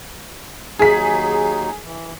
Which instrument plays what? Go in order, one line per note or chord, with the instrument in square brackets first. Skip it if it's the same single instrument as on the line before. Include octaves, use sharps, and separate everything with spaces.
[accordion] D#2 F#3 D#4 [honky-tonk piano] G#4 B6
[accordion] E3